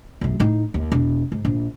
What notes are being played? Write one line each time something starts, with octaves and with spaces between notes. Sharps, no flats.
B1 F#2
A2 D#4
D#2
E1
G#2
A#1